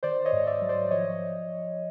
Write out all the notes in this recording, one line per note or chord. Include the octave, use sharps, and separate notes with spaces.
D#3 C5 D5
C#5 D#5
G#2
D5 E5
F#3
C5 D5
F3 C#5 D#5